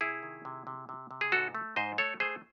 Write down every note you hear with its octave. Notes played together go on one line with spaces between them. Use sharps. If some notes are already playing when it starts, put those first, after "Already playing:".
C3 E4 G#4
D#3
C3
C3
C3
C3
G#4
G#2 F#4 A4
A3
G#2 C5 D#5
A3 A4 C#5
A3 G#4 C5